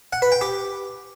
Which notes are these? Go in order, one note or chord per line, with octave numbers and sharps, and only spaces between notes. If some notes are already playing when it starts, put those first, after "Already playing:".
F#5
B4
G5
G4